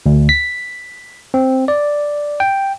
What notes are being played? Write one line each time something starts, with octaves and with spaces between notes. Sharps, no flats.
D2
B6
C4
D5
G5